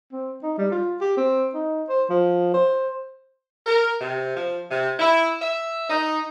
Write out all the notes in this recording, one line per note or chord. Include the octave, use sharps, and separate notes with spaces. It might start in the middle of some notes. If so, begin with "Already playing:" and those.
C4
D#4
G3
F4
G4
C4
D#4
C5
F3
C5
A#4
C3
F3
C3
E4
E5
D#4